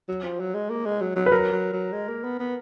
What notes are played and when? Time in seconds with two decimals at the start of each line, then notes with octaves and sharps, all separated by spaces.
0.08 F#3
0.24 F3
0.40 F#3
0.54 G#3
0.69 A#3
0.85 G#3
1.01 F#3
1.16 F#3
1.26 B4
1.31 F#3 A#4
1.52 F#3
1.73 F#3
1.93 G#3
2.08 A#3
2.24 B3
2.39 B3